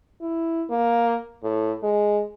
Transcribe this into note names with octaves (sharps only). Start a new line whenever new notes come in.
E4
A#3
A2
G#3